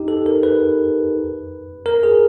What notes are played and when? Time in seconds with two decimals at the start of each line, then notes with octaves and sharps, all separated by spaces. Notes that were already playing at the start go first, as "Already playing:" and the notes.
Already playing: D#4 G4
0.08 A4
0.26 A#4
0.43 B4
1.86 A#4
2.03 G#4